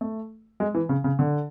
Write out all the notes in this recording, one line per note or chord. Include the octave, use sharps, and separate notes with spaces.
A3
G#3
E3
C#3
C#3
D3